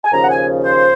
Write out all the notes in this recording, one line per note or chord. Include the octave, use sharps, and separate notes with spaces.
G#5
D#2 C#3 F3 A#5
F#5
G#5
C5